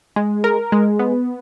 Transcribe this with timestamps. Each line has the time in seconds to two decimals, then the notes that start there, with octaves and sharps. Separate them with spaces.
0.16 G#3
0.44 A#4
0.72 G#3
0.99 B3